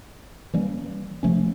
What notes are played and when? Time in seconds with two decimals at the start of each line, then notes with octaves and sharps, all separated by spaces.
0.54 E3 G3 A#3 C#4
1.23 C3 F3 A3 C#4